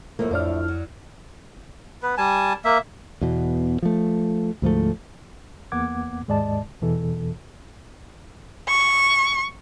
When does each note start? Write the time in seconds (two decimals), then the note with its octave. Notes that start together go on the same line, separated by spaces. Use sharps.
0.19 F#2 A2 F3 A3 A#3
0.31 F2 F3 D4 D5 F6
0.68 F#3
2.03 B3 B4
2.18 G3 G#5 A5
2.65 A#3 E5
3.21 E2 B2
3.82 F3 A3
4.62 D2 G#2 F3 A3
5.72 E2 A#3 B3 F#5 D6 G#6
6.28 D#2 G#2 G#3 D5 D#5 A5
6.82 E2 B2 E3 A4
8.68 C#6